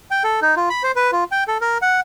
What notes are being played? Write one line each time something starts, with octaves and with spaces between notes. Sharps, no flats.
G5
A4
D#4
F4
B5
C5
B4
F4
G5
A4
A#4
F#5